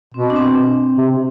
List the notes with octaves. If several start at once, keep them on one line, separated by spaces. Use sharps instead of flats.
B2 C4
D4
C4
C3